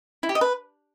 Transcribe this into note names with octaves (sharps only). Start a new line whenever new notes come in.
E4
G4
D#5
B4